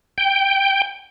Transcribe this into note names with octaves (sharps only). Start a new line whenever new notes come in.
G5